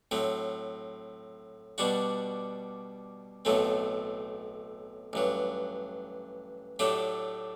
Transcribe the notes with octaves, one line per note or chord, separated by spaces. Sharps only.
A2 F#3 C4
B2 G3 D4 F#4
B1 A2 F#3 A3 C4
A1 G2 F#3
A2 F#3 A3 D4 G4